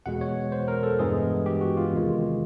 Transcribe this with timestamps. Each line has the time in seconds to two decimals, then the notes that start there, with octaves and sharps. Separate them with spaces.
0.06 E2 B2 G#3 F#5
0.21 C#5
0.52 C5
0.68 A#4
0.83 A4
0.99 G2 E3 G#3 B3 G#4
1.46 G4
1.61 F#4
1.77 F4
1.92 E2 C3 D#3 G#3